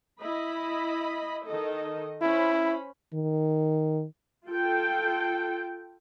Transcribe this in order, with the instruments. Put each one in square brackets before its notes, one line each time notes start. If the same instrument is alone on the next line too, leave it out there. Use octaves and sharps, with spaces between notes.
[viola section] E4 D#5 B5
D#3 A4 D#5
[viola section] C#4 C5 B5 [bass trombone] E4
[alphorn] D#3
[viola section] F4 A4 G5